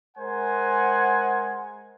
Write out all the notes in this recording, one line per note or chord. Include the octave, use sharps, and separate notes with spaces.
G#3 A#4 C5 F#5 G#5